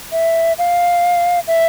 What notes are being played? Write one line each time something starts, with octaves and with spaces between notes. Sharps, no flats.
E5
F5
E5